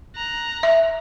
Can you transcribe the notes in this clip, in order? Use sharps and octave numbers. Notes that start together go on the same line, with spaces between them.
A#5 F#6
E5